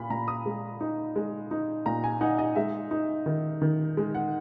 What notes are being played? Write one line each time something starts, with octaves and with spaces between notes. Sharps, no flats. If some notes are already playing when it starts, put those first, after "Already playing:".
Already playing: A#2 B5
A#2 A#5
D#6
G#3
D#4
G#3
D#4
A#2 A#5
G#5
D#4 F#5
D#5
G#3 E5
D#4
D#3
D#3
G#3
F#5